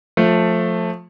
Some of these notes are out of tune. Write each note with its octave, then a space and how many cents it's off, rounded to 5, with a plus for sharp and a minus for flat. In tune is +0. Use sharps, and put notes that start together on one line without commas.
F3 +20 A3 +5